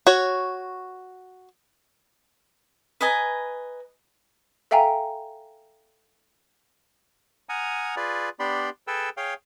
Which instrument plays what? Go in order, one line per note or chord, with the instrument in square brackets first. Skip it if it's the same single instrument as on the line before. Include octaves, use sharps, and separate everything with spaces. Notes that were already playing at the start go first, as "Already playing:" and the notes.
[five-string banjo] F#4 C#5
[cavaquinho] B4 D#5 G#5 A#5
[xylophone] A4 E5 F5 G5 G#5 A#5
[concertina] F#5 G#5 A#5 D#6 F6
F4 G#4 B4 D5
B3 D4 G4 D5 B5 C6
G#4 A4 B4 G5 E6
G#4 C#5 F5 G5